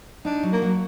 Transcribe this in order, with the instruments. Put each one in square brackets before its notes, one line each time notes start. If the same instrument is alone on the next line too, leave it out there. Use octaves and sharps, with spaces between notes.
[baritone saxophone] D4 [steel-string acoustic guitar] D#4
[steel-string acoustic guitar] F#3
[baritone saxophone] A#3
[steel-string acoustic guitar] F#3